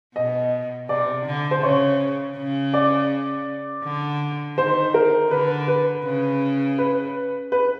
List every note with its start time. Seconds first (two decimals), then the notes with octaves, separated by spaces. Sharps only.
0.16 B2 D#5
0.89 C3 D5
1.26 D3
1.51 C5
1.63 C#3 C#5
2.37 C#3
2.74 D5
3.84 D3
4.58 D#3 C5
4.94 A#4
5.30 D3 B4
5.68 B4
6.05 C#3
6.78 B4
7.52 B4